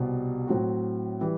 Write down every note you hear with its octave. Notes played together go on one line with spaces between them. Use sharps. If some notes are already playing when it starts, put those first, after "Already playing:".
Already playing: C2 B2 G3
A2 F#3 C4 F#4
E3 G3